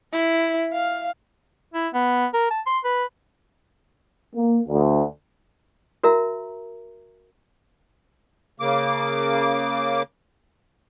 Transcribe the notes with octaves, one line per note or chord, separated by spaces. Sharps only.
E4
F5
E4
B3
A#4
A5
C6
B4
A#3
D2
F#4 A#4 E5 A#5
C#3 A#3 D6